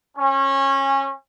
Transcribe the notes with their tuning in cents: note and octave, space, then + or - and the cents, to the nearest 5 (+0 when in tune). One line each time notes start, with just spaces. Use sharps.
C#4 -25